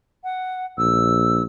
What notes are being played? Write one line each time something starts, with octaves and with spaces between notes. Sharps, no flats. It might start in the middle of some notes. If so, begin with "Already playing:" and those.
F#5
A#1 E6